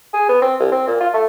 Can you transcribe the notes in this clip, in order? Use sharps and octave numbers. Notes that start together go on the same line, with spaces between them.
G#4
B3
C4
C2
C4
A#2
F4
A3